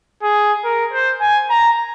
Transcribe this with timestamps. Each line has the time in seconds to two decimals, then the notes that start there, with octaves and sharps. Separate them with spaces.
0.23 G#4
0.64 A#4
0.93 C5
1.21 G#5
1.50 A#5